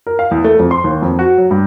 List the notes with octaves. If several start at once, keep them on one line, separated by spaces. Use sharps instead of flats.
A#4
F5
E2
A3
F2
C6
D#2
F2
F#4
F#3
G2